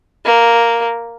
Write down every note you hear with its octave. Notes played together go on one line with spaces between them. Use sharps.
A#3